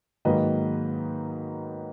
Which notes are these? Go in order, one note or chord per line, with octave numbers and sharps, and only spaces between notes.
G#2 D#3 F#3 A#3 B4 D#5